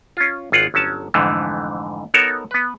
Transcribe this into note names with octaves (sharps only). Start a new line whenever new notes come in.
C#4 F4
G#1 F4 G#4 F#5
G1 F#3 C#4 A5
F2 G#2 D3 E3 A3
B3 D#4 F#4 A4 A#4 C#5
B3 B4